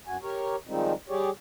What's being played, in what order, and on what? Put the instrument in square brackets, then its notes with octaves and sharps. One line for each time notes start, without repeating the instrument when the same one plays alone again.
[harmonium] F#2 F#4 G#5
G4 A#4 C#5
D#3 F3 G3 G#3 C4 D#4
G3 G4 G#4 C#5 D5